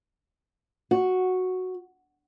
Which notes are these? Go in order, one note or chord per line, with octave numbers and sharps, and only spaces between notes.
F#4